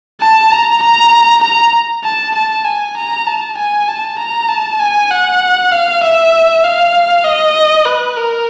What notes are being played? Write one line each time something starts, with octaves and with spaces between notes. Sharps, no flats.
A5
A#5
A#5
A#5
A5
A5
G#5
A#5
A5
G#5
A5
A#5
A5
G#5
F#5
F5
E5
F5
D#5
B4
A#4